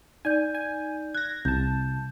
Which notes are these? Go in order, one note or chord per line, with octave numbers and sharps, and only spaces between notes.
D#4 D5 G#5 G6
G#5
F#6 G#6 A#6
C2 A5 G6